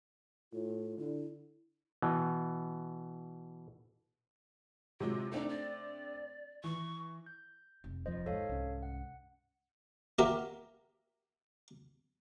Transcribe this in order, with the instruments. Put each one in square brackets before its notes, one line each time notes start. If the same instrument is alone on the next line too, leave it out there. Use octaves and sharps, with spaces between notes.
[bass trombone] A2 [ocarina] F4
[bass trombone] D3 [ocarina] E4
[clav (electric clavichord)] B2 E3
[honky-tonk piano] C3 F#3 G#3 [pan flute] F4
[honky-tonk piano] A3 C4 D4 [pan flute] D#4
[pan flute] D5
[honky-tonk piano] E3 [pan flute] C#6
[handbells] G6
[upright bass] F1
[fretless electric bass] D#1 F2 F3 [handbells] C5 D#5
[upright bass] G#2 [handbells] A4 C#5 F5
[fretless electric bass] C2 C#4
[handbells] F#5
[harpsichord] A#3 F#4 G4 A#4 E5